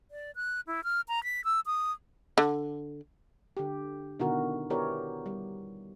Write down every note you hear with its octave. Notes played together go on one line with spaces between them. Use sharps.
D5
F#6
E4
F6
A#5
B6
E6
D#6
D3
D3 G4
B2 D3 D#3 E4 F#4 A#4
B3 E4 G4 A#4 C#5 D5
G3